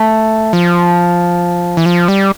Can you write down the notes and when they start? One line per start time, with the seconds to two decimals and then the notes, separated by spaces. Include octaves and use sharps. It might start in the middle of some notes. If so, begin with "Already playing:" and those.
Already playing: A3
0.53 F3
1.77 E3
1.86 F3
2.08 G3